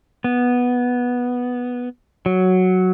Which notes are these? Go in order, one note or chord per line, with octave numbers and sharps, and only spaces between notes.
B3
F#3